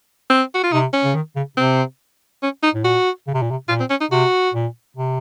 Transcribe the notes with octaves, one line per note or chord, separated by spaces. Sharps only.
C4
F#4
F4
C3 D#4
C#4
C#3
D#3
C#3
C3 C4
C#4
D#4
A2
A#2 F#4
C#3
C3
A#2
C3
A#2 F4
C4
C#4
D#4
C3 F#4
A#2
C3